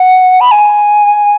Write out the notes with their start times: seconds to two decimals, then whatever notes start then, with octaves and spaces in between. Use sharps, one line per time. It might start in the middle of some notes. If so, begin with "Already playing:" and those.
Already playing: F#5
0.41 B5
0.51 G#5